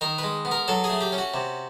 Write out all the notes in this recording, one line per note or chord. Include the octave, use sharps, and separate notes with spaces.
D#3 A#4
G#3 B4
B3
A#4
F#3 A4
G#4
A3
G4
C#4
F#4
C3